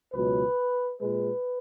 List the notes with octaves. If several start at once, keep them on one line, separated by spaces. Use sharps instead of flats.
C#2 B2 F#3 B4
A#2 G#3 B4